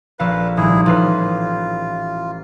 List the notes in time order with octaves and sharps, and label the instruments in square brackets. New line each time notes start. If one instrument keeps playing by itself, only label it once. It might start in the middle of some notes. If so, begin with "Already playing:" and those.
[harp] A#1 A4 F5 [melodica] B4
[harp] D#1 C2 [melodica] E4 G#4
[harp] A1 B4 C7 [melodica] F4